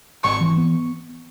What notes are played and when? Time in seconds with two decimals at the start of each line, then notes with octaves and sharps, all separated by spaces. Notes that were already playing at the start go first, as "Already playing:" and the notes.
0.24 G#1 C#6
0.41 E3
0.57 B3